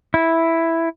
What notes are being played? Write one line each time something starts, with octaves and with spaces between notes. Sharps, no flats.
E4